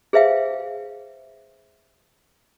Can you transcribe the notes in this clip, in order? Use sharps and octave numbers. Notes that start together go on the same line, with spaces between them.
G#4 B4 C5 E5 F5 G5